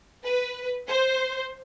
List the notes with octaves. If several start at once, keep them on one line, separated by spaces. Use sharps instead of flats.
B4
C5